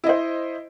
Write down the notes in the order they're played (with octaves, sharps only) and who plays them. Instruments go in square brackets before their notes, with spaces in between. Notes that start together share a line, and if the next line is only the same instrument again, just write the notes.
[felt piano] E4
D#5
C5